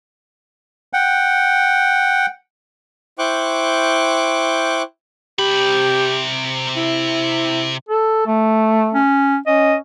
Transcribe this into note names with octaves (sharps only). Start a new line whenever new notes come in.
F#5 G5
E4 C5 G5 C#6 D6 F#6
C3 G4 B5
E4
A4
A3
C#4
C#4 D#5